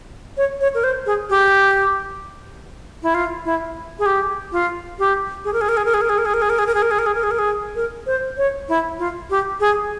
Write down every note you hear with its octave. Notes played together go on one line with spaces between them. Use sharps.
C#5
C#5
A#4
C5
G#4
G4
E4
F4
E4
G#4
G4
F4
G4
G#4
A#4
G#4
A#4
G#4
A#4
G#4
A#4
G#4
A#4
G#4
A#4
G#4
A#4
G#4
A#4
G#4
A#4
G#4
A#4
G#4
A#4
G#4
A#4
G#4
A#4
C5
C#5
E4
F4
G4
G#4